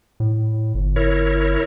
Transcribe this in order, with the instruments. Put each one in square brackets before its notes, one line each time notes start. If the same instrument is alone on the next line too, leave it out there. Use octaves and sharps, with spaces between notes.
[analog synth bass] A2
G1
[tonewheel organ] E4 A#4 C#5